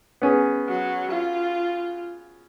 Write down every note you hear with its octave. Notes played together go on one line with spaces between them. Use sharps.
B3 C#4 G#4
F#3
F4